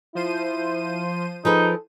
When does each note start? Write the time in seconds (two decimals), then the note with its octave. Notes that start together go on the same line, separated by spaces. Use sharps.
0.15 F3 E4 C5 D#7
1.45 F3 D#4 G#4 A4 B4